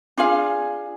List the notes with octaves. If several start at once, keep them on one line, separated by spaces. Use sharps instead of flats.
D4 F4 G#4 F5